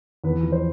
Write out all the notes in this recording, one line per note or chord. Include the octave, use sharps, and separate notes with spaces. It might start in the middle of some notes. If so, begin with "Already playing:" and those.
E2 B4
F3
C5